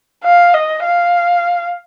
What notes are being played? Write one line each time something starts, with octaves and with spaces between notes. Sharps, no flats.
F5
D#5
F5